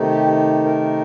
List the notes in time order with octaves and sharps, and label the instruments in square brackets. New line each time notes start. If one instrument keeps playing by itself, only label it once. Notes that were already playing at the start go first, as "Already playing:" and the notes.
Already playing: [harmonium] C3 D#3 A3 D#4
G4
A#4